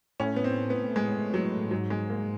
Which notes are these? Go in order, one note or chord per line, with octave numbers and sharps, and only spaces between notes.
A2 C#4
B3
C4
B3
G#3
F#3
G#2 F#3
G#3
A#3